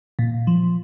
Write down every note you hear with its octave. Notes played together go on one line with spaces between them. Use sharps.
A#2
F3